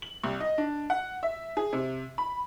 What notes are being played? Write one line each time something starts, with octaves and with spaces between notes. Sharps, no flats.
F#7
C2
D#5
D4
F#5
E5
G#4
C3
B5